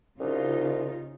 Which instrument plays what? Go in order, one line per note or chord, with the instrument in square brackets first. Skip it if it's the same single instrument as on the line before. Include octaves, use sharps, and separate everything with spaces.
[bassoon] C2 [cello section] C#3 D#4 F4